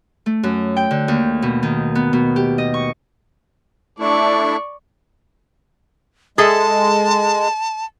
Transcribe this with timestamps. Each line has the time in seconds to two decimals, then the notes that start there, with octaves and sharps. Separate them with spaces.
0.26 A3
0.43 F#2
0.77 G5
0.91 D3
1.08 D#2
1.42 B2
1.63 D#3
1.95 B3
2.13 B2
2.36 G4
2.58 D#5
2.74 C#6
4.00 A3 D4 E4 D5 C#6
6.38 G#3 G#4 A4 E5 A5